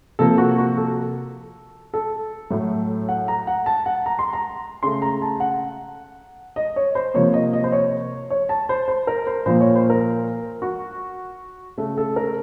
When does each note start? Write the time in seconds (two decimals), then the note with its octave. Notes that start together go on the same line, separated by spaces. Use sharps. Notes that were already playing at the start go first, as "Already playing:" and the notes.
0.19 C3 F3 A#3 A4
0.38 F#4
0.58 F#4
0.77 A4
1.94 A4
2.51 A2 F#3 A3
3.09 F#5
3.28 A#5
3.47 F#5
3.66 A5
3.86 F#5
4.06 A#5
4.19 C6
4.33 A#5
4.83 C#3 A3 C6
5.02 A#5
5.22 A5
5.40 F#5
6.56 D#5
6.76 C#5
6.95 C5
7.14 C3 F3 A#3 C#5
7.34 D#5
7.53 D#5
7.64 C5
7.72 C#5
8.30 C#5
8.49 A5
8.69 C5
8.88 C5
9.07 A#4
9.27 C5
9.46 A#2 F3 A#3 C5
9.61 C#5
9.76 C5
9.90 A#4
10.62 F#4
11.78 C#3 A3 A4
11.98 A4
12.16 A#4